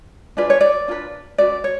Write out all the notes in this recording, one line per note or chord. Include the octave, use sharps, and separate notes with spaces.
D4 F4 G#4 B4 D5
C#5
D5
D4 F4 G#4 B4
C#4 F#4 B4 D5
C#5